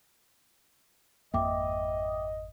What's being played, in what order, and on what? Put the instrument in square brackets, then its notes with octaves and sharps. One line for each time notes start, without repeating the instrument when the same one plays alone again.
[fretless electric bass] G#1 F2 A#3 [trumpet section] D#5 [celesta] E5 G5 D6